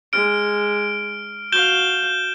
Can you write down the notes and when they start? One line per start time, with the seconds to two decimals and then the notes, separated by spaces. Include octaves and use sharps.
0.13 G#3 F6 D7
1.52 F#4 F5 G6 E7 G7